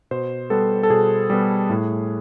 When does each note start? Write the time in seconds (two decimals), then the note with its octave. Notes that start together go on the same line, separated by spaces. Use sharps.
0.11 B2 C5
0.50 G3 B3 A4
0.83 A4
0.90 B2 G#4
1.30 G3 B3
1.70 A2